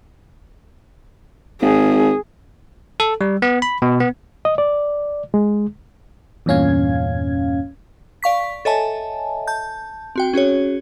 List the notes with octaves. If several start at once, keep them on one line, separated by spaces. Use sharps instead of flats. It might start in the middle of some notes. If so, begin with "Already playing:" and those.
G#1 G#4
A4
G3
B3
B5
B2
B3
D#5
D5
G#3
E2 G2 A#2 C#4 F5 G#6
D5 F5 C#6 B6
A4 C#5 D#5 E5 G#5 A5
A5 G6
C4 F#4 G5
C#4 F#4 G#4 C#5